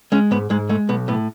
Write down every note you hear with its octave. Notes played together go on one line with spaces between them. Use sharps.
G#3 C#4
G#2 B3
G#2 G#3
G#3 A3
B1 B3
A2 B3